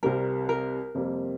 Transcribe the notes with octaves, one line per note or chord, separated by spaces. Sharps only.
C2 C3 G3 A#4
A#4
F2 C3 G3 A#3